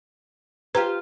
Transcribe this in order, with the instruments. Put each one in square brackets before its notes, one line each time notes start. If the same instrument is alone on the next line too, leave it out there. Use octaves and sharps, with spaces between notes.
[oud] F4 G4 C5 [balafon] B4 A#5